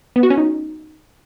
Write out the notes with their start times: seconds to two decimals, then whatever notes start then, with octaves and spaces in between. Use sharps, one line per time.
0.16 B3
0.23 F#4
0.30 C#4
0.38 D#4